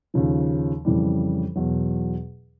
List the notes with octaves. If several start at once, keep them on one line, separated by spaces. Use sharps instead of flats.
D#2 C#3 F3
F2 C#3 E3 G3
E2 B2 F#3